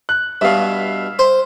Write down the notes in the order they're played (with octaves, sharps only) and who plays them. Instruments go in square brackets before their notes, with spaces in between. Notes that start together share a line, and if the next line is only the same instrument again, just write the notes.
[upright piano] F#6
[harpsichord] G2 B2 [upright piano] E5 F5
[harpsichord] C5